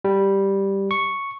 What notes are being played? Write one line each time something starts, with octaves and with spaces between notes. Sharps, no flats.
G3
C#6